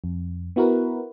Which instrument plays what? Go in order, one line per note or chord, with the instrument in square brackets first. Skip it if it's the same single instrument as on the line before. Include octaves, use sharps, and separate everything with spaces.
[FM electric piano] F2
B3 E4 F#4 A#4 B4